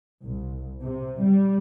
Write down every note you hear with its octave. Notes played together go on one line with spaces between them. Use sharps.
C2
C3
G3